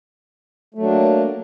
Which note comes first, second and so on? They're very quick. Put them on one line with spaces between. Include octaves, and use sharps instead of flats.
A3 F#3 D4 A#3